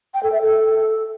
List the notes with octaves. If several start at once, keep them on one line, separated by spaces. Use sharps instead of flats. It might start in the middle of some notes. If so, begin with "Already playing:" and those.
G5
A4
E5
A4